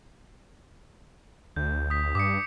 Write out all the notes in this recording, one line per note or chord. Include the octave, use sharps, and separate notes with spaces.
D2 G6
D#6 B6
G2 D6 D#6 C#7